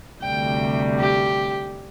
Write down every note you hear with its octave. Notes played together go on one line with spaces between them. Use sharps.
D2 C3 G3 G5
G4